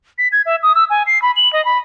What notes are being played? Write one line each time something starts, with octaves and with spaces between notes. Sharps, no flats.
B6
G#6
E5
D#6
E6
G#5
C7
B5
F#7
D#5
B5